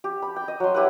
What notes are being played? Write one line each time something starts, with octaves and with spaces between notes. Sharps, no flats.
G4
B5
G5
D#5
F#3 C6
E4 G4 B4 F#5